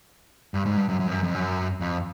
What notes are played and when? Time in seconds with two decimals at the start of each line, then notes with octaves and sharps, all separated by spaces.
0.54 G2
0.66 G#2
0.77 G2
0.89 F#2
1.00 F#2
1.07 F2
1.11 F#2
1.23 F2
1.35 F#2
1.81 F2